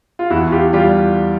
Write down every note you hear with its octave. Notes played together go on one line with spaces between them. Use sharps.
F4
E2 E4 F#4
F4 G4
G3 F4 G4